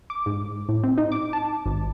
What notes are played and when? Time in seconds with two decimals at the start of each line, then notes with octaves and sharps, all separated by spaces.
0.10 D6
0.26 G#2
0.69 A2
0.84 C4
0.98 D#4
1.12 D6
1.33 A5
1.66 G#1